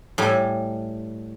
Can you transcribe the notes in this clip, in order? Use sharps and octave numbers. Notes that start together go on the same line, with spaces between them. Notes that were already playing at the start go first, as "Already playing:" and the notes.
A2 G3 G#5